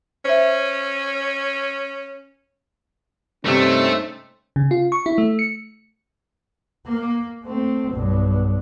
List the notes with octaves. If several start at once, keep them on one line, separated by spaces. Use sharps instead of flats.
C#4 C5 E5
G2 C3 A3 C#4 D#4 C5
C#3
F4
C#6
E4
A3
C#7
A#3
A3 C4
B1 G2